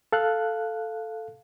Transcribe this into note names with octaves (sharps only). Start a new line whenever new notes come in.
A4 F5 F#6